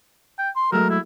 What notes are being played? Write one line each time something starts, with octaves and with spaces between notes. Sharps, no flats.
G5
C6
F#3 G#3 A3 A#4
E4